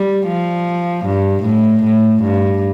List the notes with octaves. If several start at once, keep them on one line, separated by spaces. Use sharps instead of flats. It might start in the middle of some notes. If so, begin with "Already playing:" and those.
Already playing: G3
F3
G2
A2
A2
G2